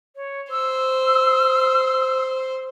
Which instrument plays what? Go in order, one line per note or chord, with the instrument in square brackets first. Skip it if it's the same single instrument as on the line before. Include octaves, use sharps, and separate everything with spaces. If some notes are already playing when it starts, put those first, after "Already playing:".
[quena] C#5
[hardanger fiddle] C5 [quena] E6